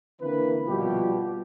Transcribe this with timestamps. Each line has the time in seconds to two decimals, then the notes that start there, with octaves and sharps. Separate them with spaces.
0.21 D3 E3 A#3 C4 B4
0.67 A#1 G2 B2 G3 F4 G4